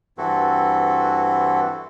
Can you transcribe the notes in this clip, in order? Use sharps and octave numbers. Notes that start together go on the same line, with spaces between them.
G2 E3 C4 E4 F#4 A4